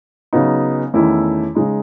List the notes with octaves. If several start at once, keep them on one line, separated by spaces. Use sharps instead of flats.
C#3 F#3 B3 D#4
E2 D#3 A3 C#4 E4
C#3 G#3 D#4